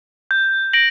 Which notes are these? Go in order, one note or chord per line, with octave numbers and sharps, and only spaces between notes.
G6
A#6 D7 F#7